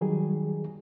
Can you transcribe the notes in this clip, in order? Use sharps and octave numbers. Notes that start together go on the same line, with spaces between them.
D#3 F#3 G3 G#4